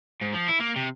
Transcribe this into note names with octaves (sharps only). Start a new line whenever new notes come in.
G#2
F3
E4
A#3
C3